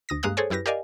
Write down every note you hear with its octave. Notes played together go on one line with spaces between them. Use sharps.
D2 D#6 A#6
G2 G#3 A#3 F5 D#6 F#6
G#4 A4 C5 C#5 G#5
F#2 E4 G4 B4 A#6
G4 A#4 D5 D#5 F5 G#5